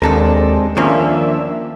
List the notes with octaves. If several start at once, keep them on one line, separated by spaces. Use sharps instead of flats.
D#2 G#3 C4 D4 A4 A#4
D#3 F3 A#3 C#4 D4 E5